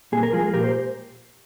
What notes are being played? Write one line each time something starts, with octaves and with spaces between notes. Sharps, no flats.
A#2 G#4
A#4
F3 G#3 F4 G#4
A#2 G4 A#4
C5